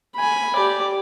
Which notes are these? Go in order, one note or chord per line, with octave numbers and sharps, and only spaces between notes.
G#5 B5
G4 D5